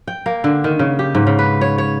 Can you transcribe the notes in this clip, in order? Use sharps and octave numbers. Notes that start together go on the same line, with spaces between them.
G5
A#3
D3
D#3
C#3
G4
G#2
C#3
B4
C#5
C#5